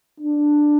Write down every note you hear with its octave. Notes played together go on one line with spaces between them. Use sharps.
D4